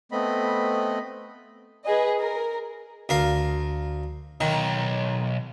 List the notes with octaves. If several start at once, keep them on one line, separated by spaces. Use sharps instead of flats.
A3 B3 C4 D#5 B5
G#4 B4 D#5
A#4
D2 A#4 F5
B1 D#3